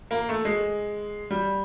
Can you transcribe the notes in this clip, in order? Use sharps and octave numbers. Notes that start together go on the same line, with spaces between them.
A#3
A3
G#3
G3